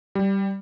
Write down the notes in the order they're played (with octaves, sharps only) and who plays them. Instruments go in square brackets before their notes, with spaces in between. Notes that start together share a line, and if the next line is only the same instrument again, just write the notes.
[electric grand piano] G3